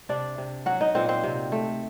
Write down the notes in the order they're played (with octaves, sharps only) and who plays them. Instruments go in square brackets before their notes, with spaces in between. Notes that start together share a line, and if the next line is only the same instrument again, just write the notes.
[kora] C3 D4 D5
C3
F#3 F#4 F#5
D#4 D#5
A#2 C4 C5
C4 C5
C3
A3